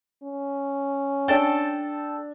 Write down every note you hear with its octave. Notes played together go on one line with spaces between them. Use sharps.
C#4
D4 A4 G5 A6